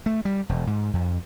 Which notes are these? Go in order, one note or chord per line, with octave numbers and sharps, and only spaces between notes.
A3
G3
E1
G#2
F2